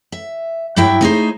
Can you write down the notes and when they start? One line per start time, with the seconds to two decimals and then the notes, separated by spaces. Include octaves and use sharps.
0.12 E5
0.76 G2 F#3 E4 E5 G5
1.01 A3 B3 D#4 E4 G#4 C5